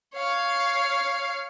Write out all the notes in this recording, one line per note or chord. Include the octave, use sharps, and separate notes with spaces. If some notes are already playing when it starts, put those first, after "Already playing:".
C#5 F5